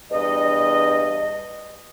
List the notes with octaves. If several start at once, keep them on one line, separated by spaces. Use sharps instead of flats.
E2 G2 D#5